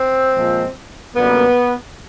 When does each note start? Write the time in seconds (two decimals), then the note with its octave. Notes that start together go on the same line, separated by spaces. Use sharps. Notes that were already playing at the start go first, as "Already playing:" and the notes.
Already playing: C4
0.34 A#2 F3 G#3
1.15 F#2 D3 G3 A#3 B3